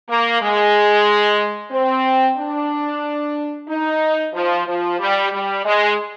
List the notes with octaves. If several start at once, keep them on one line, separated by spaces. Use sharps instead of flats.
A#3
G#3
C4
D4
D#4
F3
F3
G3
G3
G#3